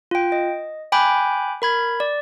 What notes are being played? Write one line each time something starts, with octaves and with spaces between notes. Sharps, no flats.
F4 G5
D#5
G5 G#5 B5 D6 F#6 G6
A#4 B5 G#6
D5